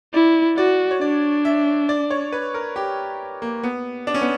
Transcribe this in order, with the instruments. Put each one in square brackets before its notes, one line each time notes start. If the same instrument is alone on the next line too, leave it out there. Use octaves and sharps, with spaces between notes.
[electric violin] E4 [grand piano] D5
[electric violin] F#4 [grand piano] D5
[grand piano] C#5
[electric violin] D4 [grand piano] D5
[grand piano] E5
D5
C#5
B4
A#4
G4
A#3
B3
D4
C#4
B3